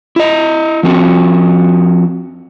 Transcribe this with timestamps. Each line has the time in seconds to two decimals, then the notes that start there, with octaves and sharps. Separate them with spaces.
0.16 E4 D#5
0.83 F3 C4 F#4